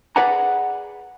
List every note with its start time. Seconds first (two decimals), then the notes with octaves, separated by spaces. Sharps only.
0.16 G#4 B4 D5 F#5 G#5 A#5